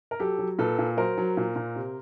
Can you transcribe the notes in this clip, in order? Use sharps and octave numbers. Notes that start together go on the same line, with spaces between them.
A#4
F#3 G4 A4
F#3
A#2 A4 B4
A#2
F#3 A#4 C5
F#3
A#2
A#2
C3